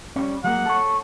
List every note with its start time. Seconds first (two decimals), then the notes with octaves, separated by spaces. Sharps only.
0.16 G3 C#4
0.44 F#3 G#3 A#3 F#5
0.66 A4 C#5